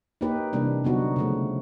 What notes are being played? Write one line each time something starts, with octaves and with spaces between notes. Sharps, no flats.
A#3 D#4 G4 B4
C3 E3 G3 A#3 D4
D3 F#3 B3 D#4 F#4
C#3 F3 A3